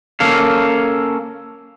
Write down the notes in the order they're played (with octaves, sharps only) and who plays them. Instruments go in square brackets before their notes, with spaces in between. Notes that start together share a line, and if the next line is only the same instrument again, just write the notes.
[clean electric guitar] A#3 C#4 A4 F5